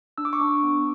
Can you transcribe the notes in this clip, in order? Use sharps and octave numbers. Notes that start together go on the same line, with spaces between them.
D4 E6
D6
C#6
D4 D6
B3